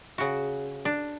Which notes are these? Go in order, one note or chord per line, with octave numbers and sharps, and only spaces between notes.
C#3 F#4
D4